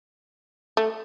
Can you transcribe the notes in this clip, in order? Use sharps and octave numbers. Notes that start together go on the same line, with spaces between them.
A3